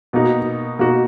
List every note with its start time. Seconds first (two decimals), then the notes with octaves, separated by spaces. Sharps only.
0.13 B2 A#3 D#4 F#4
0.79 B2 A#3 D#4 F#4